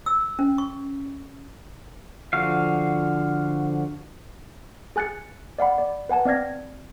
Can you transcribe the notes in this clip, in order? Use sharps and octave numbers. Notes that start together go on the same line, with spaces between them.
E6
C#4
C#6
D3 F3 F#4 F5
G#4 G#5 F#6 A6 C#7
D5 F5 F#5 B5
D5
B4 F#5 G#5 A5
C4 D5 F5 F6 G#6 A#6